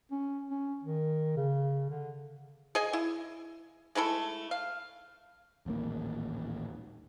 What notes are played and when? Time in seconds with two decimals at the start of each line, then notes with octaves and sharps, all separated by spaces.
0.11 C#4
0.51 C#4
0.84 D#3
1.36 C#3
1.90 D3
2.75 G#4 D#5 G#5
2.93 E4
3.95 G#3 A3 E4 A4
4.51 F5
5.66 D#1 A1 D#2 A#3